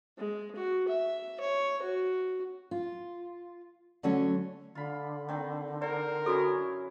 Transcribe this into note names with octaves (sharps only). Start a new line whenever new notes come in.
G#3
F#4
E5
C#5
F#4
F4
D3 F#3 A3 C#4 C#5
D3 F4 B5
D#3 C4 B5
A#4 C5 D5
F#2 C#4 E4 F#4 A4